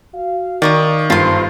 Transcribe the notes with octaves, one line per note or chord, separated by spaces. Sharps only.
F#4 F5
D#3 D5 C#6 D#6
G1 G2 F4 C5